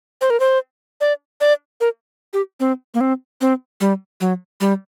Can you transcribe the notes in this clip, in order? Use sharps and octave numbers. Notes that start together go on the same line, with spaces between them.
C5
A#4
C5
D5
D5
A#4
G4
C4
A#3
C4
C4
G3
F#3
G3